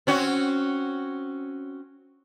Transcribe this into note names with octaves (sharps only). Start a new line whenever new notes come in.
C4 C#4 F#4